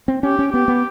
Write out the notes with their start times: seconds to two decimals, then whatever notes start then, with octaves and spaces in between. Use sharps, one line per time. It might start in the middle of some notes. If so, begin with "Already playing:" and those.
0.08 C4
0.23 C#4 G4
0.39 C#4
0.53 B3 G4
0.68 B3